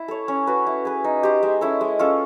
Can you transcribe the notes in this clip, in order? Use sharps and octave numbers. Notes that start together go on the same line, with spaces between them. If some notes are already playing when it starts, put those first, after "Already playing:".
Already playing: E4
A4 C#5
C#4
F#4 B4
E4
G#4 B4
D#4
G4 C5
G#3
C#4 E4 A4
G#3
C#4 F4 A4